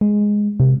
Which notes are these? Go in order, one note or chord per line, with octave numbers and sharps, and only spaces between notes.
G#3
C3